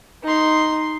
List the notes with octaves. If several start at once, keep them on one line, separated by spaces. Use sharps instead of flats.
D#4 C6